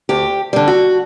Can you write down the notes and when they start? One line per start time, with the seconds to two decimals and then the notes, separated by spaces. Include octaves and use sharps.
0.09 D2 G4
0.53 D3 G3
0.68 F#4